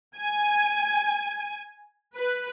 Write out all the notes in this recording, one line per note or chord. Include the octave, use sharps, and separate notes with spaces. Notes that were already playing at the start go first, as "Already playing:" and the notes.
G#5
B4